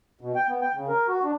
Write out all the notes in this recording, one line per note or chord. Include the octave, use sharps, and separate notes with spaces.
B2
G5
B3
G5
C#3
A#4
F#4
D4